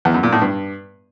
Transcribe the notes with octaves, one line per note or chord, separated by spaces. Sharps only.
E2
F#2
A#2
A2
G2